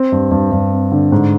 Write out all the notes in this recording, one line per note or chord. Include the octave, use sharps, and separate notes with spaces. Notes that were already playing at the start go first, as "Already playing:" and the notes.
Already playing: C4
G2
G2
G2
C4
D3
G#2